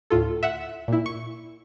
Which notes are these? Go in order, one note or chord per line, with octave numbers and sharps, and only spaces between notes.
D2 A2 F4 A4
E5 F#5
A#2 E4
C#6